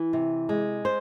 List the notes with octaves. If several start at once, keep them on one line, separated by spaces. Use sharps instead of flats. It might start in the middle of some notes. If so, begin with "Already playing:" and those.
Already playing: E3
C3
G#3
C5